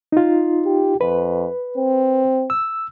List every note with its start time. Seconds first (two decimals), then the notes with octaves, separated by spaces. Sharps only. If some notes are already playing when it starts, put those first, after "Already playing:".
0.12 D#4 F4
0.65 G4
1.01 F2 B4
1.77 C4
2.50 E6